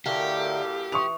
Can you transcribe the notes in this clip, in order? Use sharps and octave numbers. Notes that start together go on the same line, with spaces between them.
F#2 A2 D3 A3 G4 A#4 F5
E3 C#6 D#6 F7